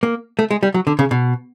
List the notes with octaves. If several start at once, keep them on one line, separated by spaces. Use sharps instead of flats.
A#3
A3
G#3
G3
F#3
D3
C#3
B2